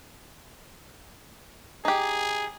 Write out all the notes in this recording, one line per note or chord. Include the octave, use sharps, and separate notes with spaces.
D#4 G4 G#4